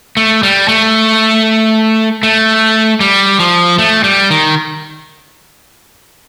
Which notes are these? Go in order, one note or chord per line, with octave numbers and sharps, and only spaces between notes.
A3
G3
A3
A3
G3
F3
A3
G3
D#3